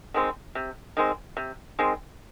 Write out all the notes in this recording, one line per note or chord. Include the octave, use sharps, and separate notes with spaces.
D#3 G#3 C4
C3
D#3 G#3 C4
C3
D#3 G#3 C4